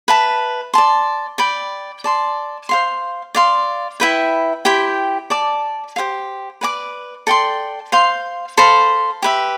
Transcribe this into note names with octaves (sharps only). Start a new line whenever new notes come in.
B4 E5 A5
D5 A5 C6
D5 G5 B5
D5 A5 C6
C5 F5 C6
D5 F5 C6
E4 B4 E5 G5
E4 G4 C5 G5
D5 A5 D6
G4 C5 F5
B4 D5 A5 D6
A4 D5 G5 C6
C5 F5 C6
A4 C5 F5 B5
G4 B4 E5